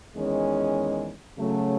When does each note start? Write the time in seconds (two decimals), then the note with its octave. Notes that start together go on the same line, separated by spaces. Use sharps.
0.14 E2 D#3 G#3 C#4
1.38 C#3 F#3 A3